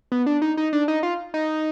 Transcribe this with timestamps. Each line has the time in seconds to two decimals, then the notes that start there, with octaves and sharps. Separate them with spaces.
0.12 B3
0.26 D4
0.42 D#4
0.57 D#4
0.73 D4
0.88 D#4
1.03 F4
1.34 D#4